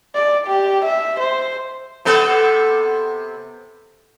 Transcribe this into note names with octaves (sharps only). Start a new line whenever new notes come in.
D5
G4
E5
C5
C3 B3 A4